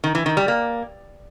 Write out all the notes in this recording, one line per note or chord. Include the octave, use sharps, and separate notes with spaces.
D#3
E3
D#3
G3
A#3